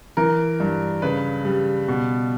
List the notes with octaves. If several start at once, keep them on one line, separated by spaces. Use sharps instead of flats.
E3 A#4
G2
C#3 B4
G3
B2